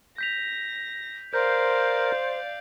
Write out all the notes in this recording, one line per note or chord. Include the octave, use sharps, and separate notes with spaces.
G6 A#6 B6 F7
A#4 C5 D5 F5 G6